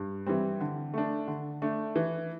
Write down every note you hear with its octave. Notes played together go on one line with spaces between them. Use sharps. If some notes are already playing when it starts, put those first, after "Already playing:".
Already playing: G2
E3 G3 C4
D3
A3 D4
D3
A3 D4
E3